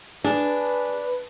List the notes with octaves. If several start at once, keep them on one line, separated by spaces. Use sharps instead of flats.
D4 G#4 B4